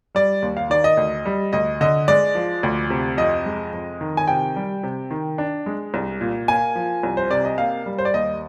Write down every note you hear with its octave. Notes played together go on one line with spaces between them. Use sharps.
G3 D5
D#2
F5
D#3 D5
D#5
D2
G3
D2 D#5
D3 D#5
G#3 D5
F3
D2
C3
F2 D#5
G#3
F2
D#3
G#5
C3 G5
G3
C3
D#3
D4
G#3
C2
A#2
A#3 G#5
F3
C2
C5
C3 D5
D#5
A#3 F5
G3
C5
D5
D#2 D#5